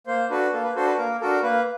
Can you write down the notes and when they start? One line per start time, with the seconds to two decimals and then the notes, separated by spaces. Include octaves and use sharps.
0.07 A#3 C5
0.30 D4 F#4 A4 B4
0.53 A#3 A4
0.63 B4
0.75 D4 F#4 A4 C5
0.86 B4
0.98 A#3 A#4
1.21 D4 F#4 A4 A#4
1.42 A#3 B4